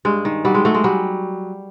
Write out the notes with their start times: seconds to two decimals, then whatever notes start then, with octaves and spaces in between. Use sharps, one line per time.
0.05 G2 G#3
0.25 D#3
0.45 F#3 G3
0.55 G#3
0.65 F#3 A3
0.75 G#3
0.84 F#3 G3